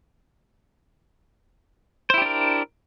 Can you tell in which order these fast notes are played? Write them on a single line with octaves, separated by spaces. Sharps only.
C5 E4 G4 D4 A#4